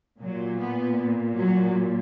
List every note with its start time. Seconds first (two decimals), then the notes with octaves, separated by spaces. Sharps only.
0.20 A#2 F#3
0.59 B3
1.37 F#3